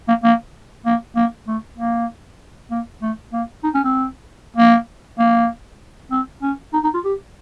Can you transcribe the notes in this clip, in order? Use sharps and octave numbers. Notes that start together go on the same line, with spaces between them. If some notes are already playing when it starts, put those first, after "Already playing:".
A#3
A#3
A#3
A#3
A3
A#3
A#3
A3
A#3
D#4
C#4
C4
A#3
A#3
C4
C#4
D#4
D#4
F4
G4